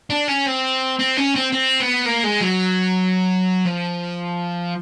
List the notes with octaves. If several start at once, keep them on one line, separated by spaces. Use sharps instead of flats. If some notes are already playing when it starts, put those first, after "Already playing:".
D4
C#4
C4
C4
C#4
C4
C4
B3
A#3
G#3
F#3
F3